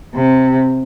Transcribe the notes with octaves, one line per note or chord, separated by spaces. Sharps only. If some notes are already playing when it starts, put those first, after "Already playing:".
C3